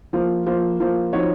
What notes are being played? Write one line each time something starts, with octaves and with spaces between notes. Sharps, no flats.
F3 A#3 F4 C5
F3 A#3 F4 C5
F3 A#3 F4 C5
F3 C4 D#4 F#4 C#5